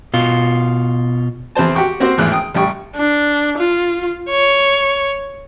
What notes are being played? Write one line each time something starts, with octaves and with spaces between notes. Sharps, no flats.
B2 F4
E2 C4 C5 A5
F#4 G4 F#5 G5 C#6
A#3 C4 F#4 G4 C5
G#1 E2 A2 F#6
G5 D#6
A1 G3 G5 C#6
D4
F4
C#5